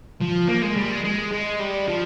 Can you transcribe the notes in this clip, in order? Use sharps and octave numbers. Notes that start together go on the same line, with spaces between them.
F3
A#3
G#3
G3
G#3
G#3
G#3
G3
F3